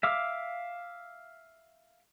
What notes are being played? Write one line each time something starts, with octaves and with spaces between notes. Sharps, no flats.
E5 F5 D6